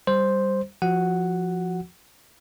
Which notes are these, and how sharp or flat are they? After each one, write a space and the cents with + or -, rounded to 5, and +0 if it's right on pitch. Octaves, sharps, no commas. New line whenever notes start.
G3 +0 C5 +0
F3 +0 F#4 +5 F#5 +0